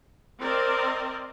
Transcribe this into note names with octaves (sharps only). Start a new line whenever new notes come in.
C4 A#4 C5 D5 D#5